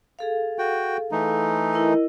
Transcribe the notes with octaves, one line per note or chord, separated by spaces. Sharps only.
G#4 A4 F5
F#4 G5
E3 A3 D#4
E4 A#4 D#5